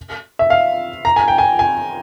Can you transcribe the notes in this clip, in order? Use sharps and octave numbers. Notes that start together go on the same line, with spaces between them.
E5
F5
A#5
G#5
G5
G#5
G#5